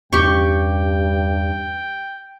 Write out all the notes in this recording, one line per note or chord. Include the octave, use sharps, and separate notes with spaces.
E2 G2 C#4 G4 G5 C#6